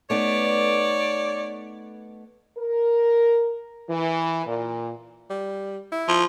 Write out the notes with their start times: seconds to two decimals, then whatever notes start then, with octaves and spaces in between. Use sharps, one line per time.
0.10 A3 B3 D#4 C#5 D5
2.58 A#4
3.90 E3
4.46 A#2
5.30 G3
5.92 E4
6.08 F3